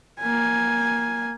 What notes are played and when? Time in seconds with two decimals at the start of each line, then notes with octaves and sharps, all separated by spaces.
0.20 A#3 G#5